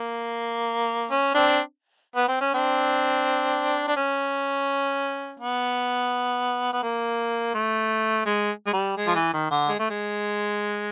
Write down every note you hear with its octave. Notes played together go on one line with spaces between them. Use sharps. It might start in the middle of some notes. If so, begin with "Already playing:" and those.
Already playing: A#3
C#4
C4 D4
B3
C4
C#4
C4 D4
D4
C#4
B3
B3
A#3
A3
G#3
G#3
G3
G#3
F3
E3
D#3
D3
G#3
A3
G#3